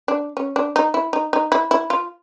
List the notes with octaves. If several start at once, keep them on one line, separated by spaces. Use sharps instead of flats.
D4
C#4
D4
D#4
E4
D#4
D#4
E4
E4
F4